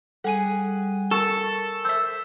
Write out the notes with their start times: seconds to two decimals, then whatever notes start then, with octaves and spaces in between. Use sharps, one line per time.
0.24 G3 G#4 A4 F#5 D#7
1.11 A4 A#4 C#6
1.85 C5 E5 E6